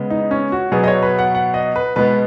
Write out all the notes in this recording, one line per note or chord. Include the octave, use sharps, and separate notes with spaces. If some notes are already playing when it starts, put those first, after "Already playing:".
Already playing: C#3 G#3 B3
D#4
C#4
F#4
B2 F#3 B3 G#4
D#5
C#5
B4
F#5
F#5
D#5
B4
B2 G#3 B3 B4